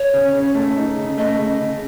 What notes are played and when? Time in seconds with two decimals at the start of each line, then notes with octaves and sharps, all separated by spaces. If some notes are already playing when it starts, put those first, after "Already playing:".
Already playing: C#5
0.14 C#3
0.34 C#3
0.55 A3
0.77 D#4
0.97 C#3
1.18 A3 D#5
1.39 C#3
1.60 C#3